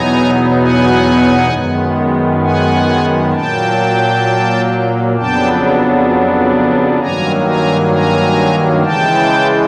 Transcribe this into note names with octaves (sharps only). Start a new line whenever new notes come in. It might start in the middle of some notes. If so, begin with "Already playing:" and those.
Already playing: E2 B2 F#3 B3 D#4 G#5 A#5
F#5 G#5
F#2 D#3 G#3 B3
F#5 G#5
A#2 F#3 A#3 G5 A5
F2 C#3 F#3 B3 D4 G5 A5
G2 D#3 F#3 A#3 G#5 A#5
G#5 A#5
G#5 A#5
C#3 E3 G#3 G5 A5